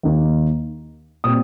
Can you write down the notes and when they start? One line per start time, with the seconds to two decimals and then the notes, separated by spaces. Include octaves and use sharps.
0.03 D#2 D#3 A#3 D#4
1.24 A#2 G3 C4 D#6